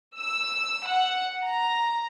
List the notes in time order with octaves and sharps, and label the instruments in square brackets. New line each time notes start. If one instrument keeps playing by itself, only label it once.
[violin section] E6
F#5
A#5